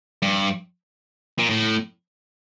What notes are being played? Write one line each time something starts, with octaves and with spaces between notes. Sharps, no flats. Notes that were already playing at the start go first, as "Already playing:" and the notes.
G2
A#2
A2